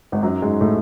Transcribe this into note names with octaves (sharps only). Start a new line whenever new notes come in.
G#1 G#2
F#2 F#3
G#2 G#3
A2 A3